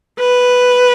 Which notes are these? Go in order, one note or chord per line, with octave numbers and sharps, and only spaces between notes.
B4